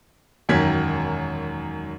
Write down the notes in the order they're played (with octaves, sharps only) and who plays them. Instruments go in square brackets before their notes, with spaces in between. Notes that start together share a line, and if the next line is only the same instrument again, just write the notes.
[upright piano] E1 F#2 D#3 G#6 B6